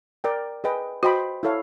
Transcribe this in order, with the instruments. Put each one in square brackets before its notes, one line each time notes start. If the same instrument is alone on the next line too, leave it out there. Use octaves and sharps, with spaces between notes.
[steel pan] A#4 D5 G5
G#4 B4 D#5 G5
[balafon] F#4 [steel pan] C5 D#5 G5 B5
[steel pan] E4 A4 C#5 F5